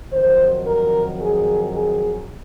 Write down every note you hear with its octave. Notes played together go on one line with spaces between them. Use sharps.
F2 D#3 F#3 C5
A#4
G#4
G#4